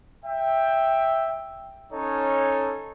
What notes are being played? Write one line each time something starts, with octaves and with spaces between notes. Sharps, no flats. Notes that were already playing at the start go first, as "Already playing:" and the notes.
E5 G5
C#4 D#4 A4 C#5